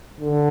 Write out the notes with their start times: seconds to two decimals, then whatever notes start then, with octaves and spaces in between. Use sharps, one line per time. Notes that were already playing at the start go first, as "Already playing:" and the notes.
0.20 D3